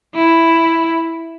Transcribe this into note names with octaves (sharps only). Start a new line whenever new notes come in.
E4